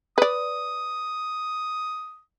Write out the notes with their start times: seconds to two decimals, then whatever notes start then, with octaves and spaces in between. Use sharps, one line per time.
0.18 B4 D5 D#6